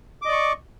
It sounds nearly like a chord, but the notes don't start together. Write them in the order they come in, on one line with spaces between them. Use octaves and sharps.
D6 D#5 D5 C#6